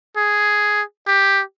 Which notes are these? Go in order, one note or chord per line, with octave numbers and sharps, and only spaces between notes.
G#4
G4